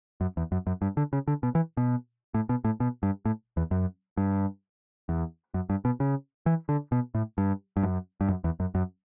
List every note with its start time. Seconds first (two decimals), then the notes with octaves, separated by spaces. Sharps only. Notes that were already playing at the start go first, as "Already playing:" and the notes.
0.21 F#2
0.37 E2
0.52 F#2
0.67 F#2
0.82 G2
0.97 D3
1.13 C#3
1.28 D3
1.43 B2
1.55 E3
1.77 B2
2.34 A2
2.49 B2
2.65 A2
2.80 B2
3.03 G2
3.25 A2
3.57 E2
3.71 F#2
4.17 G2
5.09 E2
5.54 F#2
5.70 G2
5.85 B2
6.00 C#3
6.46 E3
6.69 D3
6.92 B2
7.15 A2
7.38 G2
7.77 G2
7.83 F#2
8.21 G2
8.29 F#2
8.44 E2
8.60 F#2
8.75 F#2